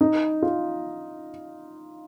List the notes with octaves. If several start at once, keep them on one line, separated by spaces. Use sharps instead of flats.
D#4
F4